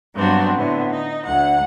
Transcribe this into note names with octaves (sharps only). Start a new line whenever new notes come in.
G2 F#3 B3 C4 D4 F#4
A2 D3 B3 C4
D#4
D2 F#5